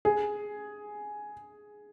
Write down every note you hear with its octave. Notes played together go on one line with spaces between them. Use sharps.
G#4